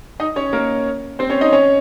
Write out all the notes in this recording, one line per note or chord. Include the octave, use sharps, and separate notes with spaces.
D#4 D#5
C#4 C#5
A#3 A#4
C4 C5
C#4 C#5
D#4 D#5
C#4 C#5